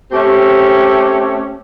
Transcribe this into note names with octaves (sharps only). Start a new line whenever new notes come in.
A3 C4 C#4 G4